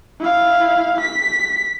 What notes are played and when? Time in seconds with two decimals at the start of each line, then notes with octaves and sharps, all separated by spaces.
0.20 E4 F5
1.00 B6